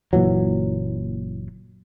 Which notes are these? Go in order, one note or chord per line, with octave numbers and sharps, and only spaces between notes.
F#1 A#2 E3 F#3